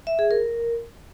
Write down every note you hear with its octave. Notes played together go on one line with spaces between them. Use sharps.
E5
G#4
A#4